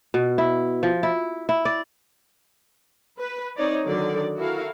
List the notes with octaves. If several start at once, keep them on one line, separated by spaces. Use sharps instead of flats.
B2
E4
F3
E4
E4
D5
B4
C4 D#4 C#5 D5
D3 D#3 F#3 D5
E4 F#4 A4 A#4 F5